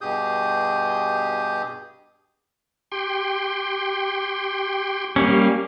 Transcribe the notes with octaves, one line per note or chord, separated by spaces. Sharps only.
G2 B2 G4 G#4 D#6 G6
G4 G5 C6
G3 A#3 C#4 G4 F5